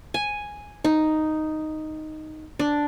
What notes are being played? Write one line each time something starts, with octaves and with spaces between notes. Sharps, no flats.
G#5
D#4
D4